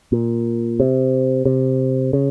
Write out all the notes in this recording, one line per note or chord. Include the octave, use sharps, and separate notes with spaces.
A#2
C3
C3
C#3